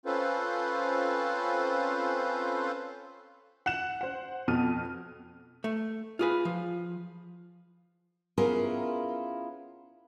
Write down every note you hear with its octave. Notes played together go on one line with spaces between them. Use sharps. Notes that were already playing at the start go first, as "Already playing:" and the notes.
C4 C#4 F4 A4 B4 C5
F#5 F#6 E7
C5 F#5
F2 B2 A5 F6 D#7
A3
F4 G#4 B4
F3
B3 C#4 E4 F4 G#4 A#4